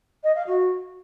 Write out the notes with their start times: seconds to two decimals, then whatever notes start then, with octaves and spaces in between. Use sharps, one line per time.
0.23 D#5
0.35 F5
0.47 F#4